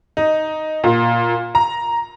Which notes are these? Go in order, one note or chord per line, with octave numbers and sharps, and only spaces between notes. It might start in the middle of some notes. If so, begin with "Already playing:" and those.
D#4
A#2
A#5